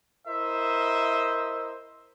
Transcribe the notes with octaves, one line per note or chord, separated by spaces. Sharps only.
E4 A#4 C5 D#5 E5